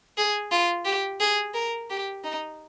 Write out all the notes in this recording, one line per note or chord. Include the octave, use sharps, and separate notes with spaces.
G#4
F4
G4
G#4
A#4
G4
D#4